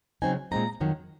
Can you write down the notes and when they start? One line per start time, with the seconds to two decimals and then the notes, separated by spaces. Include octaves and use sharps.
0.22 C#3 F#3 C4 D#4 G#5
0.51 A#2 G#3 C4 D#4 A#5
0.80 F2 D#3 F#3